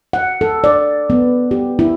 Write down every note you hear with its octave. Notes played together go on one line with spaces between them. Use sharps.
F#5
A4
D5
B3
G4
E4